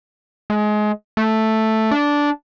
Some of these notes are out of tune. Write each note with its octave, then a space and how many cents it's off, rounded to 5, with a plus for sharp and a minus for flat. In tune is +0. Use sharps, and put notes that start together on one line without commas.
G#3 +25
A3 +0
D4 -10